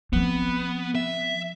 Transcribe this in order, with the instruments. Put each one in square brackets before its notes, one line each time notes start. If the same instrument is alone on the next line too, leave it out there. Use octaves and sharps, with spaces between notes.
[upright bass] F3 C4 [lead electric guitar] B3
[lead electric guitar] E5